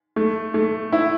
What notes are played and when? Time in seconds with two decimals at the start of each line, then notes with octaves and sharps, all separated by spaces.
0.16 A3
0.54 A3
0.92 E4